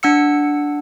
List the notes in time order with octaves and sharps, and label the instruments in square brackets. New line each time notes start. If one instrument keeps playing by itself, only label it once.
[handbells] D4 F#5 E6 C#7